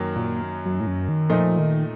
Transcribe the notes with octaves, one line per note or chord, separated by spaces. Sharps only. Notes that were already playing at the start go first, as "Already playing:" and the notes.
Already playing: F#2 D#3 F#3 A#3
A#2
F#2
A2
F#2
D#3
A#2 F3 A3 D#4
D#3